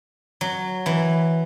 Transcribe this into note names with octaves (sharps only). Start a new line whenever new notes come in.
F#3
E3